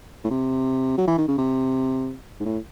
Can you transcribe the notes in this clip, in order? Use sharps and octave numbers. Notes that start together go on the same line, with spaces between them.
A2
C3
F#3
E3
D#3
C#3
C3
G#2
A2